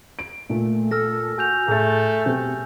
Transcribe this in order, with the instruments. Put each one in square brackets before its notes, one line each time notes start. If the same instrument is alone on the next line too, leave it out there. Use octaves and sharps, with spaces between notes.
[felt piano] D7
[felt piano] A#2 [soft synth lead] A3
[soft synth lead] A4 [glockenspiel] E6 F6 A#6
[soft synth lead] F#4 [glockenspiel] G#5 G6 F7
[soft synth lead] A2 [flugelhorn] A3 [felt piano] G#4 A6
[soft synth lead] B2 [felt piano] C4 G4